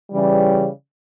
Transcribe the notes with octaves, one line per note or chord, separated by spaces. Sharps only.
C#3 E3 G3